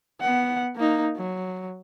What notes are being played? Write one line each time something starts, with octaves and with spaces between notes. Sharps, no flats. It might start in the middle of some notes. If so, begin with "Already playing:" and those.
B3 F#5
A#3 D#4
F#3